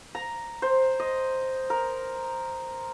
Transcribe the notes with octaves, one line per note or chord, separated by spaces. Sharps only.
A#5
C5
D#5
A#4